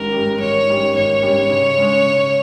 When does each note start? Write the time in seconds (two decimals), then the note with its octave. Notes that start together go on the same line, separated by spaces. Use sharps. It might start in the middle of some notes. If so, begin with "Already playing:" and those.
Already playing: G#1 G#2 G3 C#4 G4 A#4
0.12 G#2 G3 C#4 G4
0.40 G#1 C#5
0.67 G#2 G3 C#4 G4
0.95 G#1 C#5
1.22 G#2 G3 C#4 G4
1.49 C#3
1.78 G#3 C#4
2.05 C#3